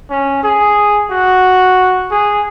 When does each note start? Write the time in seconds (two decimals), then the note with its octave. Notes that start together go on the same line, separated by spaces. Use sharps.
0.10 C#4
0.44 G#4
1.11 F#4
2.11 G#4